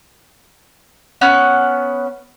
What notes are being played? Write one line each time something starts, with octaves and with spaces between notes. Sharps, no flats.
B3 C#4 F#5